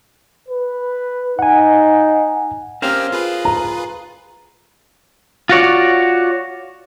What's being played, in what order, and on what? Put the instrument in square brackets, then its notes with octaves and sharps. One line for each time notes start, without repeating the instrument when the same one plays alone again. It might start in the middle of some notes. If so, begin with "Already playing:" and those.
[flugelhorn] B4
[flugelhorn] D#4 [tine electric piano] F#5 G#5
[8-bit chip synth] C4 C#4 G4 [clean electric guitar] A#4 C5 F5
[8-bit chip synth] F4 G#4 B4
[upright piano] A#5
[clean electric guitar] F4 F#4 C#5 D5